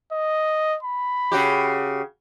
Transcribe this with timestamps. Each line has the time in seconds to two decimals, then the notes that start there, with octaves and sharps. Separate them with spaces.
0.12 D#5
0.83 B5
1.32 C#3 F#4 G4